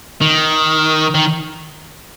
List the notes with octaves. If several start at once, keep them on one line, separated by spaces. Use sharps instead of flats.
D#3
D#3